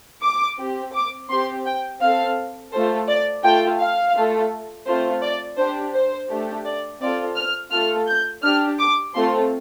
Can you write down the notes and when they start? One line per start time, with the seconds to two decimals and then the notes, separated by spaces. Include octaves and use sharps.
0.23 D6
0.59 C4 G4
0.94 D6
1.30 C4 G4 C6
1.66 G5
2.01 C4 A4 F5
2.73 A3 F4 A4 C5
3.08 D5
3.44 A3 F4 A4 G5
3.80 F5
4.16 A3 F4 A4
4.86 A3 C4 F4 C5
5.22 D5
5.58 D4 G4 C5
5.94 C5
6.29 A3 D4 G4
6.65 D5
7.01 C4 F4 A4 D5
7.36 F6
7.72 A3 F4 A4 F6
8.08 G6
8.43 D4 G4 F6
8.79 D6
9.15 A3 C4 F4 A4 C6